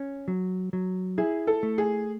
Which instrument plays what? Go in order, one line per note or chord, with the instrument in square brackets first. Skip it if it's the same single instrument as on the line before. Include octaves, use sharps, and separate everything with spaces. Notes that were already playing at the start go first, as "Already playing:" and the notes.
Already playing: [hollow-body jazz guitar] C#4
F#3
F#3
[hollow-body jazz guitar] E4 [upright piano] G#4
[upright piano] A4
[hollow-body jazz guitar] A3
[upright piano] G#4